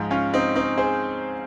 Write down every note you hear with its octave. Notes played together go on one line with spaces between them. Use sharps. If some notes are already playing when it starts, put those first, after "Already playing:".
Already playing: G#2 F3 G#3
C#4 F4
C4 D#4
C4 D#4
G#4 C5